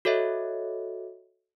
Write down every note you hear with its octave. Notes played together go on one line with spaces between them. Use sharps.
F#4 A4 C#5 D#5 E5